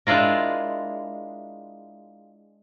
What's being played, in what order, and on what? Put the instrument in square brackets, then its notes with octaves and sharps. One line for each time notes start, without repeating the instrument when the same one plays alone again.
[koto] G#3 D4 E4 F4 A#4